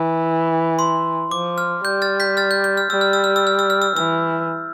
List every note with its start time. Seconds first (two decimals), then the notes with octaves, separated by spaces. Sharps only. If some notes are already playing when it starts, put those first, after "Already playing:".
Already playing: E3
0.79 C6
1.31 F3 D6
1.58 F6
1.84 G3 G6
2.02 F6 A6
2.20 G6 B6
2.37 F6 A6
2.51 G6
2.64 G6
2.77 F6
2.90 G3 E6
3.01 F6
3.13 E6
3.24 F6
3.36 E6
3.47 F6
3.59 E6
3.70 F6
3.82 E6
3.96 E3 E6